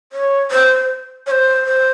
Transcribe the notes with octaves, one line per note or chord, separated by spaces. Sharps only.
C#5
C5
C#5
C5
C5